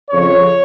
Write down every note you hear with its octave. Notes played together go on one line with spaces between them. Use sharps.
F2 C#3 F3 C#5